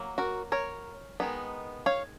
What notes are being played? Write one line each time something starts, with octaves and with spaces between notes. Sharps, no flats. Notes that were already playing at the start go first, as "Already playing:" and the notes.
Already playing: F#3 A#3
F#4 A#4
A#4 C#5
D#3 G#3 B3 D#4
C#5 F5